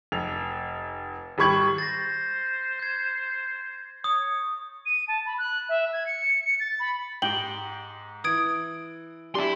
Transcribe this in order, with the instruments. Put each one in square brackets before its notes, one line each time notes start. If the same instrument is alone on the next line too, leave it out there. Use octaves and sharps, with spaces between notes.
[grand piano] F1 F7
G#1 G3 B5 C#6 G#6 F#7
[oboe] C5 [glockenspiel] A6 A#6
[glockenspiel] G6 G#6
[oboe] C#5 [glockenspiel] D#6
[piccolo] D#7
A5
B5
F#6
E5
G#6
C#7
C#7
A6
B5
[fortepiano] G#2 G4 [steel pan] G5 [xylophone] F#7 G7
[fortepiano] E3 [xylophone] D#6 G#6 D7
[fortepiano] D4 [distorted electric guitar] E4 C6 [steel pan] G4